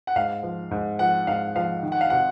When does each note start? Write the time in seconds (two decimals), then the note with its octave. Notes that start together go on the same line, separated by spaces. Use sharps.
0.07 F#5
0.16 G#2 F5
0.43 F3
0.71 G#2
0.99 F3 F#5
1.27 G#2 F5
1.55 F3 F5
1.83 D#3
1.92 F#5
2.01 F5
2.10 C3 F#5